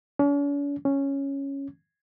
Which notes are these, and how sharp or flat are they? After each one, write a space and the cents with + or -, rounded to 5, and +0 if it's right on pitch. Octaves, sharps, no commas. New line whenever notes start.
C#4 +45
C#4 -5